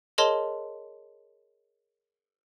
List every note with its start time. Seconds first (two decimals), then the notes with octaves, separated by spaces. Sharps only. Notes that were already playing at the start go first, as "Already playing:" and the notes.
0.18 G#4 A#4 C#5 D#5 A5 C6